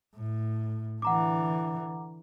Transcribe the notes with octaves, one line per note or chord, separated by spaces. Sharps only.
A2
D3 E3 F#5 A#5 D6